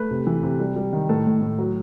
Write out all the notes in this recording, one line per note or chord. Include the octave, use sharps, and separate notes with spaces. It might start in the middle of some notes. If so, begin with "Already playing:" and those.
Already playing: A3 B4
C3
E3
C3
G3
G3
D#3
A2 A4
A2
A2
F#3